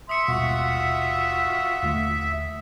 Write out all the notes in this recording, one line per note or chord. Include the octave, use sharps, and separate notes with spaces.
E5 C6 D#6 C#7
D#1 G#1 B2 F4 F#4
D#2 D3 A3